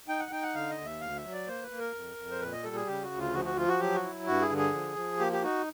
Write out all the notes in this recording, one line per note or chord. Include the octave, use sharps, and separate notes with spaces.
D#4 G5
F#5
D#4 G5
F#5
D3 F5
D#5
D#2
E5
D2 F5
E5
F#3
D5
A#3 C5
B4
A#3
A#4
F2
F2
C5
A#2 B4
D#5
G3 A4
G#4
C#3 G4
F#4
D2
F4
F3 F#4
F#4
F3 F4
F#4
F#3 G4
F#4
E4
G2 F#4
G#4
D3
G#4
F3
F3
A#3 G4
G4
D#4 F#4